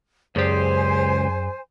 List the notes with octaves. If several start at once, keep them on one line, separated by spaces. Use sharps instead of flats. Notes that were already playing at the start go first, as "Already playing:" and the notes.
C#2 F#2 G4 G#4 C5 D5 G#5